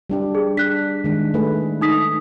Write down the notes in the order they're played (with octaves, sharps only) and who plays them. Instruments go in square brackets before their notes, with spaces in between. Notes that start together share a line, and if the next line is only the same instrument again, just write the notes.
[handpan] G3 D4 G4
[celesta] G#4
[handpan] D4 [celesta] F#6 B6
[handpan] D#3 G#3 D4
A3 G#4 B4
[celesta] D#4 D#6 B6